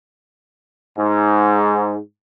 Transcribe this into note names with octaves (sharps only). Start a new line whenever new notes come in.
G#2